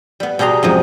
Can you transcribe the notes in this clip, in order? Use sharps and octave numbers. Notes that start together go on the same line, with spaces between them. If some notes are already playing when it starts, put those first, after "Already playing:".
G3 B3
B2 G3 G4 G#4 A#5 C6
F#2 C3 F3 G#3